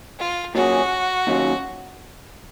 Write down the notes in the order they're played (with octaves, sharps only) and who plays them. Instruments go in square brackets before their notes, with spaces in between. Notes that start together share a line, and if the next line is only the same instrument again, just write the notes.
[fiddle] F4
[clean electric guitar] A#2 F#3 C#4 G#4 [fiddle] F#4
[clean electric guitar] D#2 C#3 F#3 C#4 F4